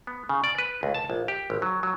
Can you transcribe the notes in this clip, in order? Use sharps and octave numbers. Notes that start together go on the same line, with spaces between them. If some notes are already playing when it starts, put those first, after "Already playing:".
B3
C#3
D5
B4
C#2
A5
A#1
G4
G#1
F#3
F#3